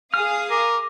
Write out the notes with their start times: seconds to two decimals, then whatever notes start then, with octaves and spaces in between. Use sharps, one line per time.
0.14 G#4 F5 D#6 F6
0.50 A#4 D6